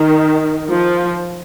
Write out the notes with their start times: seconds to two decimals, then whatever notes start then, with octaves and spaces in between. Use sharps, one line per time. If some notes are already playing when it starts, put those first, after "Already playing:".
Already playing: D#3
0.69 F3